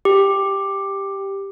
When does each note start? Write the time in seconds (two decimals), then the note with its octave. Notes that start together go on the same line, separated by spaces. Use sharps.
0.05 G4